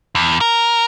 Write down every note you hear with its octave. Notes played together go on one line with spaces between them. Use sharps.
E2
A#4